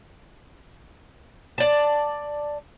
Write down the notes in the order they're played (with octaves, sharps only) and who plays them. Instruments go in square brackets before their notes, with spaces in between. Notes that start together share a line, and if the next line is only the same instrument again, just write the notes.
[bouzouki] D5 A5